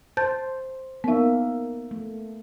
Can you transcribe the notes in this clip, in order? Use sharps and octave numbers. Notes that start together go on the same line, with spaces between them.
C5 A5 G6 A6
A#3 B3 D#4 E5
A3